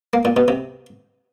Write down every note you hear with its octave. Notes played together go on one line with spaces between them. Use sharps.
A#3
A#2
B2
C3